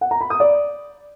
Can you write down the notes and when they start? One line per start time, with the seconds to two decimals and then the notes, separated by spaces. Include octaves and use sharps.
0.01 F#5
0.11 A#5
0.21 B5
0.30 D#6
0.40 D5